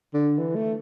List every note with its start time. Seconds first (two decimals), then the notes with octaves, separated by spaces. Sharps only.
0.14 D3
0.38 E3
0.56 A3